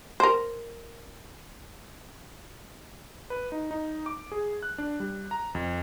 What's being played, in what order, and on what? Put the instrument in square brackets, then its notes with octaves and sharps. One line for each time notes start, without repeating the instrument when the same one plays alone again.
[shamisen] A#4 C5
[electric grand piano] B4
D#4
D#4
D6
G#4
F#6
D4
G3
A#5
F2